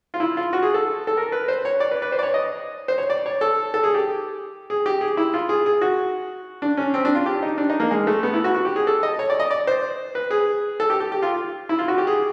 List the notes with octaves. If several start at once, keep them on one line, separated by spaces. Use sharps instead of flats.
F4
E4
F4
F#4
G#4
A4
A4
A#4
B4
C5
C#5
D5
B4
B4
C5
D5
C#5
D#5
C5
C#5
D5
C#5
A4
A4
G#4
G4
G#4
G4
G#4
E4
F4
G#4
G#4
F#4
D4
C#4
C4
D4
F4
G4
D#4
D4
D#4
A#3
G#3
A3
B3
E4
F#4
F#4
G4
G#4
A4
D#5
C#5
D5
D#5
D5
C5
B4
G#4
A4
G4
G4
G4
F4
E4
F4
F#4
G4
G#4